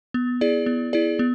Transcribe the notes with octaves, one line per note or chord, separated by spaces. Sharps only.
B3
E4 G#4 D5
B3
E4 G#4 D5
B3